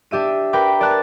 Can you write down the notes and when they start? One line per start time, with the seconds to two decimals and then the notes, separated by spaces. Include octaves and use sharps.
0.11 D4 G4 E5 D#7
0.53 A#4 B4 G5 B5 D6
0.81 D5 A5 F#6 A6